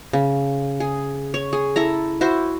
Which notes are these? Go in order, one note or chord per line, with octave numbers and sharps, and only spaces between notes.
C#3
G#4
C#5
G#4
E4 A4 A#5
E4 F#4 C5